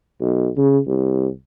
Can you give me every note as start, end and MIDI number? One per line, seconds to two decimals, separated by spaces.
0.21 0.48 35
0.57 0.78 49
0.87 1.27 36